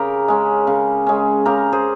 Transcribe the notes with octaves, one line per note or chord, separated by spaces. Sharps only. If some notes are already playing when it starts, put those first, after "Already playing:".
Already playing: C#3 G4 A#4
G#3 C#4
C#3
G#3 C#4
C#3 G4 A#4
G#4 C5